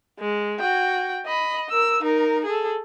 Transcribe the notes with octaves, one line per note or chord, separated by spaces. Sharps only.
G#3
F#4 G5
D#5 B5
A#4 E6
D#4 A#4
G#4 A4